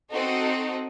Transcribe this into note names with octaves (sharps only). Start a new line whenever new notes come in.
C4 D#4 F#4 A4